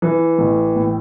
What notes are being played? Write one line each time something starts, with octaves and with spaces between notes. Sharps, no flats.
E3
A1
A2